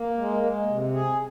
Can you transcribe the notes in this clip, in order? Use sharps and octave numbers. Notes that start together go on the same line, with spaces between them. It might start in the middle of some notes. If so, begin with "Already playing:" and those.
Already playing: A#3
G#3
G#3
C3
G#4